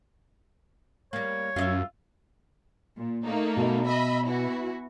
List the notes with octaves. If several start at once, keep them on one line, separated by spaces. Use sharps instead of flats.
G3 A#3 C#5
F#2 F4 D#5 E5
A#2
A3 A#3 D#4
B2
D#5 E5 B5
E3 E4 F#4